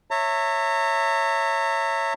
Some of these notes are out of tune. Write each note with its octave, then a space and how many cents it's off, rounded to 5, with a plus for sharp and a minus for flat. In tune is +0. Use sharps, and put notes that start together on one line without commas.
C#5 -10 E5 +0 A#5 -40